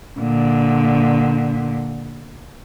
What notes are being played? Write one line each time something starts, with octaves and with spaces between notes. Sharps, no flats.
A#2 D3